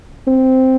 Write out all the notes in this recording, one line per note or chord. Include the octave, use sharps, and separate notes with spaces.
C4